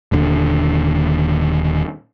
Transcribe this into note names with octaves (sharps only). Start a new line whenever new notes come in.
D#1 D#2 D3